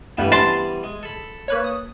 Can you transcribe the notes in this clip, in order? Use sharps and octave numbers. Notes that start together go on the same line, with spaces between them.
G2 E3 G3 A3 B3 E7
A5 C6
G#3
A4 B5
A#3 B4 C#5
D#6